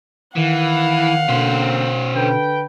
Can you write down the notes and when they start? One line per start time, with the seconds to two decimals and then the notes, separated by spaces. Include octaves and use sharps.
0.36 D#3 E3 F5 F#5
1.29 B2 D3 A#3 C4 C#4 C5
2.14 D3 B4 G5